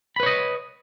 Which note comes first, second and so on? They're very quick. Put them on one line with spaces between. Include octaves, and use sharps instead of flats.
B5 B4 C#5 D#5